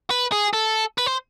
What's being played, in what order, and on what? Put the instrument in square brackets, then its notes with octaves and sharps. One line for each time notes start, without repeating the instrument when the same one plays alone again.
[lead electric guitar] B4
G#4
A4
B4
C5